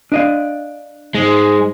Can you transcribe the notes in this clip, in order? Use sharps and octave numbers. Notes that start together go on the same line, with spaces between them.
D4 D#5 F5
G#2 G#3